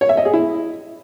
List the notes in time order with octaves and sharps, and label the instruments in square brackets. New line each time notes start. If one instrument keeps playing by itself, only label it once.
[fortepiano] C#5
E5
D#5
G#4
E4